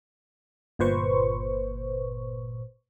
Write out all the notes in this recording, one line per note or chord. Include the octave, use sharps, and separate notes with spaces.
G1 A#2 B4 C5 C#6